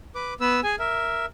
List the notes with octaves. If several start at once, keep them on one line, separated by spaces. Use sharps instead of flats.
B4 D6
B3 B4 E6
G#4 G#5
A#4 E5